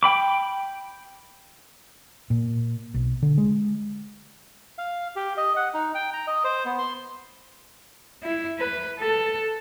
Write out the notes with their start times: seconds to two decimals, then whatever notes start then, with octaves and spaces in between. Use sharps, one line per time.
0.03 G5 B5 D6
2.30 A#2
2.94 B1
3.22 D3
3.38 G#3
4.78 F5
5.16 G4
5.37 D#5
5.56 F#5
5.74 D#4
5.95 G5
6.13 A#5
6.27 D#5
6.44 C5
6.65 B3
6.79 C6
8.23 E4
8.59 B4
8.99 A4